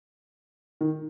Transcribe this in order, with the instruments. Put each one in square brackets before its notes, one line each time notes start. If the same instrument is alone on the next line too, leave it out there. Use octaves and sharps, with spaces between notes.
[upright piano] D#3